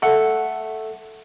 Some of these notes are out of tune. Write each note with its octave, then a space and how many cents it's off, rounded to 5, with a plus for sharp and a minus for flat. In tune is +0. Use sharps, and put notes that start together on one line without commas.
A3 +0 F#5 +0